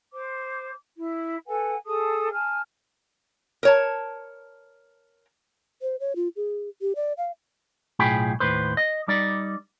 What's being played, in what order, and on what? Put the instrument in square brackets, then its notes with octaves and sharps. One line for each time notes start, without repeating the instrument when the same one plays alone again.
[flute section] C5 D6
E4
A4 B4 F#5 G#5
G#4 A4 A5 D#6
G#5 A5 F6
[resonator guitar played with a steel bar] A#4 C#5 A5
[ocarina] C5
C#5
F4
G#4
G4
D5
F5
[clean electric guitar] B1 A2 F4 G#4 G5 B5
D#2 A2 B4 C5
D#5
G3 D#4 D5